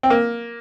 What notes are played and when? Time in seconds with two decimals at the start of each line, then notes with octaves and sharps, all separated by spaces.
0.03 C4
0.10 A#3